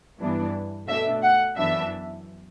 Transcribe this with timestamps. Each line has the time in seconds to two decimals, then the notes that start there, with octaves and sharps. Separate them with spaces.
0.19 G2 E3 B3 D4
0.88 B2 A3 D4 E5
1.23 F#5
1.56 F#2 E3 B3 D4 E5